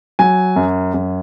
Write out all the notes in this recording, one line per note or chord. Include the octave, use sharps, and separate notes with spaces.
F#3 G#5
F#2
F#2